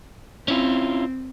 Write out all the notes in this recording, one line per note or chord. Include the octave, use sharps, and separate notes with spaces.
C4 C#4 E4 F4